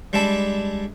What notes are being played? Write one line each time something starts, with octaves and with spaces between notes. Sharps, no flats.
G3 G#3 D4 E5 A5 B5